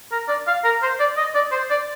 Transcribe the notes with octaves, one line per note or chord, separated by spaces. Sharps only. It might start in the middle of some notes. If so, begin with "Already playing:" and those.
A#4
D5
F5
A#4
C5
D5
D#5
D5
C5
D5